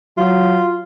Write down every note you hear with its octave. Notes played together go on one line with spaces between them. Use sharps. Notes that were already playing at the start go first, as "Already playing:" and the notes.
F#3 F4